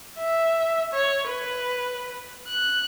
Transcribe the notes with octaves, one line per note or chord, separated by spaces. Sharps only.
E5
C#5
B4
F#6